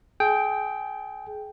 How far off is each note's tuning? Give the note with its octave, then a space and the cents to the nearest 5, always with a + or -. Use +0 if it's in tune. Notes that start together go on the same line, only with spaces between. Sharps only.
G#4 +30 G5 +0